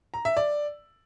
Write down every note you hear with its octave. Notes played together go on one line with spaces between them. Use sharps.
A#5
E5
D5